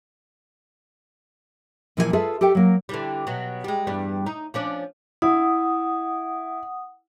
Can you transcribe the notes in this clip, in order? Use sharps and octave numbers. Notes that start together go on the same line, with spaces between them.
A#2 E3 F3 E4 A#4 G#5
F4 G#4 A4 B4 E5
G4 A4 E5 G5
F#3 A#3
D3 E3 G3
B2 F#3
G3 G#3
E2 G2 G3
D#4
F3 C#4 D4
E4 F#5 D#6